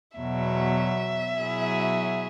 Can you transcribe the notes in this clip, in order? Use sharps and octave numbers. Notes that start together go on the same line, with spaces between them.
E2 B2 F#3 E5
B2 F#3 E4 G#4